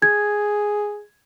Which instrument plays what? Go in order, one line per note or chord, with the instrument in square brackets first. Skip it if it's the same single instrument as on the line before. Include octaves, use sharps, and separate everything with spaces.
[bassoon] G#4 [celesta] G#6